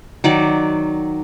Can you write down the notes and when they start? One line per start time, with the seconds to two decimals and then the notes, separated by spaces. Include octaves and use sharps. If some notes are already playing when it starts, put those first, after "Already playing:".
0.24 D#3 F#3 D5